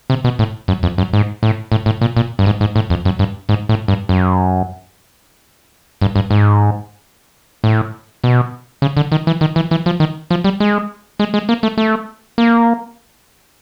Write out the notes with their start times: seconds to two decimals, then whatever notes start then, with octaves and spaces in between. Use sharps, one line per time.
0.10 C3
0.24 B2
0.39 A2
0.68 F#2
0.83 F2
0.98 F#2
1.13 G#2
1.43 A2
1.72 A2
1.86 A2
2.01 A#2
2.17 A#2
2.39 G2
2.46 G#2
2.61 G#2
2.76 A2
2.90 F2
3.05 F#2
3.19 G2
3.49 G#2
3.69 A2
3.88 G2
4.09 F#2
6.02 G2
6.16 G2
6.31 G#2
7.64 A2
8.24 B2
8.82 C#3
8.97 D3
9.12 D#3
9.27 E3
9.41 D#3
9.56 E3
9.71 E3
9.86 F3
10.00 D#3
10.31 F3
10.44 G3
10.60 G#3
11.20 G#3
11.34 G#3
11.49 A#3
11.63 A3
11.78 A3
12.38 A#3